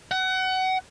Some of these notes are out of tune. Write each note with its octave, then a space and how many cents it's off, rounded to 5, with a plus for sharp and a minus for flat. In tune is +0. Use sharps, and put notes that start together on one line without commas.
F#5 +25